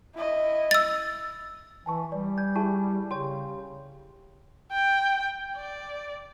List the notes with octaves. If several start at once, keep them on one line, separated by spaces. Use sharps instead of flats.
E4 D#5
E6 A6
E3 G#5 A5 C#6
G3 D5
G#5 G6
E4 G4 G#4 G#5 A5 C#6
C#3 G4 C#5 G5 C6
G5
D5